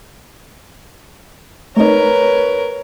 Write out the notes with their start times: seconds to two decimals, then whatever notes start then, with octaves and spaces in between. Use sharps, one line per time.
1.77 A3 C4 D#4 A#4 B4 C#5